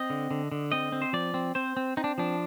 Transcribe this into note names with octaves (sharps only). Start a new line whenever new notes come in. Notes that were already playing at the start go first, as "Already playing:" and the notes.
Already playing: C4 D#5
D3
D3
D3
C4 D#5
C4
C5
F3 D5
C4
C4 C5
C4
C4 D#4
D4
F3 D4